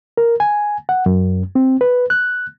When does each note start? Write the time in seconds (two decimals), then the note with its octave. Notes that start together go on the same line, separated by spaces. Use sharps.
0.17 A#4
0.40 G#5
0.89 F#5
1.06 F#2
1.55 C4
1.81 B4
2.10 F#6